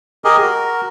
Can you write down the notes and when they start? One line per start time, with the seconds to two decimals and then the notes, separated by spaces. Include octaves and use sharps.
0.25 G4 G#4 A#4 D#5
0.42 F#4 A#4